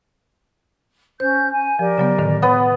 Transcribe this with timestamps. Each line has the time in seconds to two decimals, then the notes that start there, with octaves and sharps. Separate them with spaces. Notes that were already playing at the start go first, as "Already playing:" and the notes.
1.20 C#4 C5 G6
1.51 G#5
1.79 F3 G4 A#4 D5
1.98 C#3 F#3 B3
2.19 A2 D3 D#3
2.42 B3 C#5